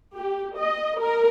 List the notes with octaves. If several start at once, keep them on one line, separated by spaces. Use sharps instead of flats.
G4
D#5
A#4